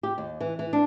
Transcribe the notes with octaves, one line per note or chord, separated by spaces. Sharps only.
G4
D#2
E3
E3
D4